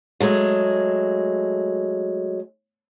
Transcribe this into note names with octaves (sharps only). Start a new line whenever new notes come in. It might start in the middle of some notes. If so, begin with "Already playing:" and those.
F#3 G#3 A3